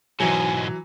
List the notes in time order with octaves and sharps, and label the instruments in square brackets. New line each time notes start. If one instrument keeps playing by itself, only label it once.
[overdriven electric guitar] G#2 B2 [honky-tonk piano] E3 F#3 [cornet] G#5